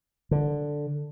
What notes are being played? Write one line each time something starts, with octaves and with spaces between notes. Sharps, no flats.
D3